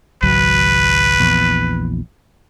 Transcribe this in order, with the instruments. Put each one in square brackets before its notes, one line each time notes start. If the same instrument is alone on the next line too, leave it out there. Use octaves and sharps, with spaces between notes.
[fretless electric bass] G#1 C#2 F#3 [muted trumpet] B4
[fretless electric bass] A#1 E2